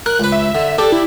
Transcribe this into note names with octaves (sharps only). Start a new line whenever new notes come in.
A#4 F#6
C#2 B4
E5
D3
D4 G4 A4
E4